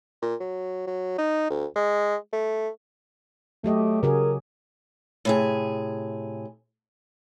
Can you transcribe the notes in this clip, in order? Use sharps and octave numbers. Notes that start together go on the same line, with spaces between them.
A#2
F#3
F#3
D#4
D2
G#3
A3
F#3 A3 G4 D#5
C#3 F#4 G#4 A#4
A2 C3 G#4